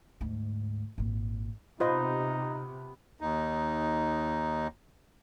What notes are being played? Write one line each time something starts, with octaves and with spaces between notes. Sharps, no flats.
D2 G#2
G#1 A#2
C3 B3 D#4 F4 C5 D#5
D#2 D#4